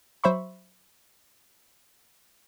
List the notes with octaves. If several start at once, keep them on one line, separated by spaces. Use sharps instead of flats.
F#3 C5 E5 B5 C#6